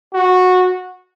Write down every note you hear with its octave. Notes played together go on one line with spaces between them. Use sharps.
F#4